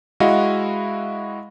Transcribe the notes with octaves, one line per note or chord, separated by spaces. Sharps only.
G#3 E4 F#4 D#5 F5